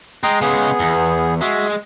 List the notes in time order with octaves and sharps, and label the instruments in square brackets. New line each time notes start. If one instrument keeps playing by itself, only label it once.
[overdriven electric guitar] G#3 [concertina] D#5 G5 A#5
[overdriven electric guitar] C#3 G#3 [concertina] B3 G#4
[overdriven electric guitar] E2
[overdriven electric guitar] G#3 [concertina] F#4 E5